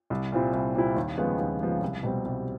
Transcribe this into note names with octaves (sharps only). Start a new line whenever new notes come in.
C2
A#2 G3 C4 E4
C2
A#2 G3 C4 E4
D#2
C#3 F3 G#3 B3
D#2
C#3 F3 G#3 B3
C2
B2 G3 C4
C2